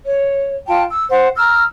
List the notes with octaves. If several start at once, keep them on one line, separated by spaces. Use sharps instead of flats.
C#5
F4 G5 A5
E6
C5 F#5
A#5 E6 F6